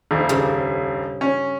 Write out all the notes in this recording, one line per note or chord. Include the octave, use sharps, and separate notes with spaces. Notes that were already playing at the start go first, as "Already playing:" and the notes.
D#1 A#1 F2
G2 C#3
C#4